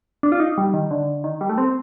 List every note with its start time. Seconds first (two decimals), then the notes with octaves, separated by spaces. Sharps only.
0.23 D4
0.32 F4
0.40 D#4
0.58 G3
0.74 D#3
0.91 D3
1.24 D#3
1.41 G3
1.49 A3
1.58 C4